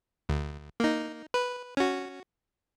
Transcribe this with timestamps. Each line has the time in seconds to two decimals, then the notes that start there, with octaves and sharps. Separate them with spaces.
0.29 D2
0.80 A#3 D#4
1.34 B4
1.77 C#4 F#4